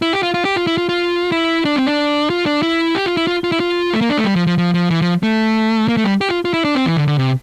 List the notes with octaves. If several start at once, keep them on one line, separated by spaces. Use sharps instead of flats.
E4
G4
F4
F4
G4
F4
E4
F4
F4
E4
D4
C4
D4
F4
D4
E4
G4
F4
E4
F4
F4
E4
F4
A3
A#3
D4
A3
G3
F3
F3
F3
F3
E3
F3
A3
A#3
A3
G3
G4
F4
F4
E4
D4
C4
E3
D3
D3
C3